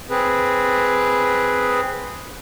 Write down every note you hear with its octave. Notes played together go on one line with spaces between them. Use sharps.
C4 G#4 B4